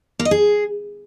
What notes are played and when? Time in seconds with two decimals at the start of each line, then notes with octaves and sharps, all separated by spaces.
0.19 A#3
0.25 D#5
0.31 G#4